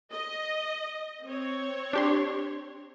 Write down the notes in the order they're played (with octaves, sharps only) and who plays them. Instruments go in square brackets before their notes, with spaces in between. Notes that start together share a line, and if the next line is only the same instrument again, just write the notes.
[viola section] D#5
C4 C#5
[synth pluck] D4 G4 C6